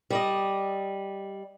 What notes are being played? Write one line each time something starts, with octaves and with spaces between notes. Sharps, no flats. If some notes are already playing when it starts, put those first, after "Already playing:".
G3 D5 D#5